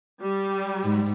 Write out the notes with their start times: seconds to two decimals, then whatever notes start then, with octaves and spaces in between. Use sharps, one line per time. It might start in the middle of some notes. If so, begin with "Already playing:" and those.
0.22 G3
0.83 G#2